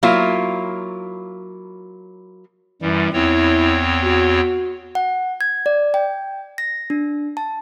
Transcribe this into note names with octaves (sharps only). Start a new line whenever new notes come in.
F#3 A#3 E4 F4
F#2 E3 G3
E2 C4 E4 C#5
F#4
F#5
G#6
D5
G5
A#6
D4
A5